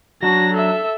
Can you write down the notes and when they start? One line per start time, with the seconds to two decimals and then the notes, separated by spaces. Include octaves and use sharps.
0.23 F#3 D4 F#4 A#6
0.53 A4 E5